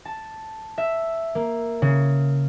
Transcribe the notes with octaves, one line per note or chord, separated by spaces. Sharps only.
A5
E5
A#3
C#3